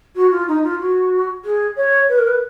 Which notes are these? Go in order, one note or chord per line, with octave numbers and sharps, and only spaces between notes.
F#4
F4
D#4
F4
F#4
G#4
C#5
B4
A#4
B4